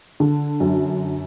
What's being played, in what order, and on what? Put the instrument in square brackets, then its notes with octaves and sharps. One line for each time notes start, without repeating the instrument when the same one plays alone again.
[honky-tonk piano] D3
F#2